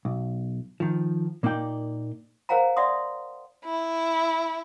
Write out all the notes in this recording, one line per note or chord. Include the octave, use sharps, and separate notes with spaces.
B1
D#3 F3
A#2 A#3 D#4 D5 G5
A#4 C5 F5 F#5 G#5 A#5
D5 E5 F#5 C6 D#6
E4